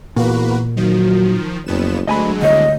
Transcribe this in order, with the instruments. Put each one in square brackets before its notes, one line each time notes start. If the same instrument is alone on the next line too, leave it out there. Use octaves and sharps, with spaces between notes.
[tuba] E2 [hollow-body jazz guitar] A#2 [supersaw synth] A#3 F#4 B4
[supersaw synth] D#3 F3 [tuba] F#3
[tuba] F#1 [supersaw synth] F2 B3 E7
[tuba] D2 [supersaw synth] D3 F#3 G#3 [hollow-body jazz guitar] D#5 G#5 B5
[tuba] D#1 [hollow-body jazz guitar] D2 C#5 [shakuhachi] D#5